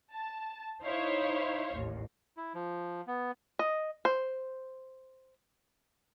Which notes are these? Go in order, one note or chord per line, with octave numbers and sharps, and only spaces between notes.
A5
D#4 E4 C5 C#5 F5
A1 D#2
E4
F3
B3
D#5
C5